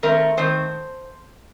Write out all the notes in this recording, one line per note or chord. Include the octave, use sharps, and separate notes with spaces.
D#3 A3 C4 A#4
D#3 A3 C4 C5